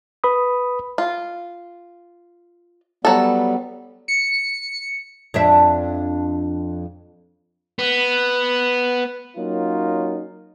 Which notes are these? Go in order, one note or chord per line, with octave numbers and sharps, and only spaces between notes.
B4 B5 D#6
F4
F#3 G3 B3 A4
C#7
F2 D4 E5
B3
F#3 A#3 C#4 D#4 F4